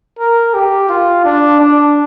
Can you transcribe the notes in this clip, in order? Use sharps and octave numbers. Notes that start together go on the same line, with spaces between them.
A#4
G4
F4
D4
D4